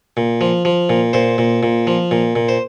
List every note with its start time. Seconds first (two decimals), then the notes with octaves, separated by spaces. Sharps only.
0.17 A#2
0.41 F3
0.65 F3
0.90 A#2
1.13 A#2 C5
1.38 A#2
1.63 A#2
1.87 F3
2.11 A#2
2.36 A#2
2.49 C5